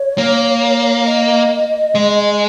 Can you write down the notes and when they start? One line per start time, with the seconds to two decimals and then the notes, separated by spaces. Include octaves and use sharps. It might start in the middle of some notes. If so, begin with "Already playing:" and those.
Already playing: C#5
0.18 A#3
1.06 D#5
1.95 G#3